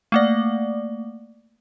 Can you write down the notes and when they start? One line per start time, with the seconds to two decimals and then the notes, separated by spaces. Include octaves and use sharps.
0.12 A3 A#3 D5